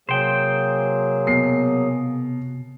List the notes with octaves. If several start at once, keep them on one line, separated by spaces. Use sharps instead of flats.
C3 F#3 A#3 G#4 C5 G5
B2 C7